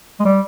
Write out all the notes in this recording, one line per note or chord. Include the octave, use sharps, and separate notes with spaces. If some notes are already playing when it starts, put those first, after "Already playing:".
G#3
G3